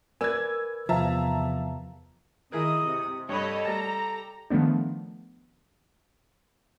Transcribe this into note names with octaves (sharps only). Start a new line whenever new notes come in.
A#4 B4 D5 G#5 E6 G#6
E2 C3 F3 E5 F5 A5 A#5
D#3 E4 G#4 A#4 D#5 D#6
C3
G2 G4 A4 C#5 D#5 B5
G3 A5 A#5
D#3 F3 A3 B3 D4